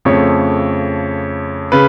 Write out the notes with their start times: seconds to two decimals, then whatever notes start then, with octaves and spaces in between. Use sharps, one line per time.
0.05 F2 C#3 F3 A3 C#5
1.72 C#3 B4